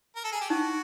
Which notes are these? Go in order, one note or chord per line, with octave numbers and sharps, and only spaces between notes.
A#4
A4
G#4
G4
D#4 F#4